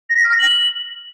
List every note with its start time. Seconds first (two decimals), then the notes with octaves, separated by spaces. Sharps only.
0.10 A#6
0.17 B6
0.24 F6
0.32 A#6
0.39 F#7